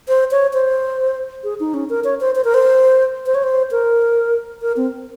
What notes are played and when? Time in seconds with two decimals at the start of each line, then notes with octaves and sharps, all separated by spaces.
0.08 C5
0.31 C#5
0.54 C5
1.44 G#4
1.60 D#4
1.74 C#4
1.90 A#4
2.04 C#5
2.20 C5
2.35 C5
2.44 A#4
2.54 C5
3.26 C5
3.35 C#5
3.43 C5
3.71 A#4
4.62 A#4
4.77 C4